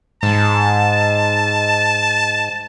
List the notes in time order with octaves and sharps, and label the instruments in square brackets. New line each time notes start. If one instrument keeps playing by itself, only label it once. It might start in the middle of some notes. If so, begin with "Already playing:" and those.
[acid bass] G#2 [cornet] A5